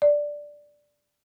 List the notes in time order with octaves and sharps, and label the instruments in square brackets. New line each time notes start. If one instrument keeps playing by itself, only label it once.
[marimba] D5